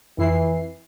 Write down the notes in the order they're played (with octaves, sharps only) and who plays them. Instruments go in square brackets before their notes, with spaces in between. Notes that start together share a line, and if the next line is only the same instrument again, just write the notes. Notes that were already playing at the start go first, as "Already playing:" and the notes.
[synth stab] F2 E4 C7 [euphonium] E3